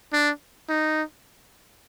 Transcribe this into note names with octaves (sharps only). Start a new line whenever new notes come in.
D4
D#4